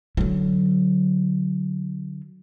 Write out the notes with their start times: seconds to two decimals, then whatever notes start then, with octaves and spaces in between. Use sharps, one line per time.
0.17 D3 F#3